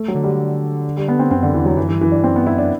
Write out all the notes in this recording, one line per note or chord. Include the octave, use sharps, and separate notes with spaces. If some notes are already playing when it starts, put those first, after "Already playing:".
Already playing: A3
F#3
D3
G3
G3
B3
C4
F#2 C4
D3
E2 E3
F#3
F#2 E3
G2 E3
F#2 E3
G2 D4
C4
F#2
B3
G2 E4
F#2 D4